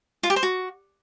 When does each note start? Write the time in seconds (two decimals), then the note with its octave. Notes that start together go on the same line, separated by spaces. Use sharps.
0.23 F4
0.30 G4
0.36 C5
0.43 F#4